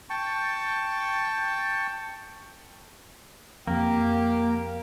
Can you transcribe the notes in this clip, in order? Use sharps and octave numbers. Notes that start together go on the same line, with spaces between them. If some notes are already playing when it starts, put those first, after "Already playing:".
G5 A5 C#6
F2 A#3 G4